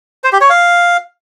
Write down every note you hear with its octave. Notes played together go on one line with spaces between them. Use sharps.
C5
G4
C#5
F5